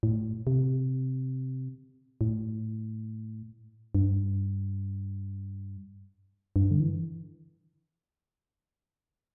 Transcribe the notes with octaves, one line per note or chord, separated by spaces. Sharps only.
A2
C3
A2
G2
G2
D3
E3